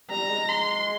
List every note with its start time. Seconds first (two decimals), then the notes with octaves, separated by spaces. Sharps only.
0.10 G3 A#5
0.30 G#3
0.49 C6